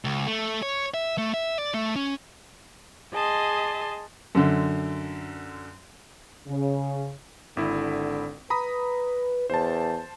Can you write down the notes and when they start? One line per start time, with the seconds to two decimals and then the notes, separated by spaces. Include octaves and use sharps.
0.05 C#2
0.27 A3
0.63 C#5
0.94 E5
1.18 A3
1.34 E5
1.59 D5
1.74 A3
1.96 C#4
3.13 G#4 D#5 A5 C6
4.35 F#2 D3
6.47 C#3
7.57 G#1 D3 E4
8.50 B4 A#5 B5 D#6
9.50 E2 C5 A5